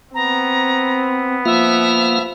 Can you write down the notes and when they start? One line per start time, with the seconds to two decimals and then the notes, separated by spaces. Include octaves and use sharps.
0.14 B3 C4 A#5
1.46 F3 A#3 F4 E5 F5